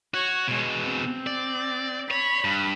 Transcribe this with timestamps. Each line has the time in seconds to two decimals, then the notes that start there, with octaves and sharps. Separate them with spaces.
0.14 F#4 C#5
0.48 B2 G#3
0.81 C4
1.27 D5
2.11 C#5 B5
2.44 G2